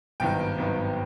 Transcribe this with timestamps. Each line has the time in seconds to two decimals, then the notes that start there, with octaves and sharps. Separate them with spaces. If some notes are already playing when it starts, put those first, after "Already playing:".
0.20 G#1 G2 D#3 F#3 B3 G5
0.58 G#1 G2 D#3 F#3 B3